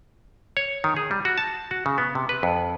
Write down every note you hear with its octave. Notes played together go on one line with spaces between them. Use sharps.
C#5
D#3
G#4
G3
F#4
A5
F#4
C#3
B3
C3
B4
F2